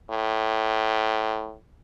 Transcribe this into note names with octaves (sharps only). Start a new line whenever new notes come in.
A2